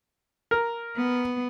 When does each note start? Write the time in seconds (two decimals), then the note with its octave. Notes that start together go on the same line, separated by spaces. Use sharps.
0.51 A#4
0.95 B3